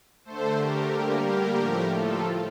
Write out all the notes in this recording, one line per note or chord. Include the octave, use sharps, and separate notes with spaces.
D3 A3 A4 C5
G4 A#4
D3 G3 A#3
G4 A#4
A2 F3 A3
F4 A4